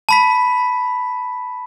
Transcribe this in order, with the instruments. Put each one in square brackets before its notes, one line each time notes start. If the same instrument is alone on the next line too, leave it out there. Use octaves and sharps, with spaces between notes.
[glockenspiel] A5 B5 B6